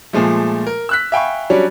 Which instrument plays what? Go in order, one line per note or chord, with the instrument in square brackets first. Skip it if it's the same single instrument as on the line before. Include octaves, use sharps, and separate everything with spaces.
[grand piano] A#2 F3 G#3 A3
A#4
E6 F#6 B6
E5 F5 G5 G#5 B5 C#6
F#3 G3 C#4 D4 F#4